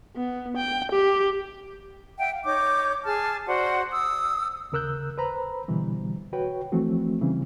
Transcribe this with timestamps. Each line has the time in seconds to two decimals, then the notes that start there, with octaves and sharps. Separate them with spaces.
0.16 B3
0.57 G5
0.92 G4
2.18 E5 F#5 G5
2.32 F5
2.45 D#4 C#5 D6 G6
3.04 G#4 A5 F6
3.46 F#4 C5 D5 F#5
3.91 D#6 E6
4.72 D#2 C#3 A#4 E6 F#6 G6
5.18 B4 C5 A#5 B5
5.68 B2 D3 E3 G3
6.33 F#4 B4 C#5 G5
6.72 E3 F3 A3 C4 F#4
7.21 C#3 E3 G3 C4 C#4